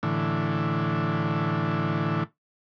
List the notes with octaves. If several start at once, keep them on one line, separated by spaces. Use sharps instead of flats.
A2 D3 E3